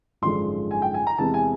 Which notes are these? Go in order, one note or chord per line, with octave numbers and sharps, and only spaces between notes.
G#1 F#2 D3 F3 G#3 C6
G#5
G5
G#5
A#5
E2 C3 E3 G#3 B3 A5
G#5